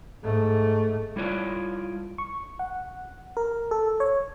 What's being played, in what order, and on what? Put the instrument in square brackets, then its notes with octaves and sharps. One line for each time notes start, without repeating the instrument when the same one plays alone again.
[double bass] G#2 A3
[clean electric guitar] G3 E4 F4 C#5 D5
[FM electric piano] C#6
F#5
A#4
A4
C#5